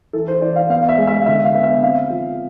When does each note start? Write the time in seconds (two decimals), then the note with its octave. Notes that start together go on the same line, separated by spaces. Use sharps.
0.13 E3 A4
0.28 C5
0.41 E3 D5
0.56 F5
0.69 B3 F5
0.83 F5
0.89 E5
0.98 G#3
1.07 E5
1.21 F5
1.26 D3 E5
1.44 F5
1.54 B3
1.63 E5
1.82 C4 F5
2.10 F3